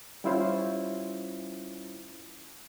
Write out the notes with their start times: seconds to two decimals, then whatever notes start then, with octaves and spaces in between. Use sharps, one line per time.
0.24 G3 C#4 E4 F4 C5 C#5